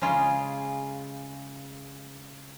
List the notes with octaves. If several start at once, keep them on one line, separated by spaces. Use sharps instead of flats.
C#3 G#3 F4